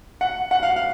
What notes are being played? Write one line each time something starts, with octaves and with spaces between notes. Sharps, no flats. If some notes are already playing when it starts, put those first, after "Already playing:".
F#5
F#5
F5
F5